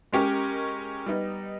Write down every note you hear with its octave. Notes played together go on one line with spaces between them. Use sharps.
G#3 C#4 G4 A#4
G3 B3 D#4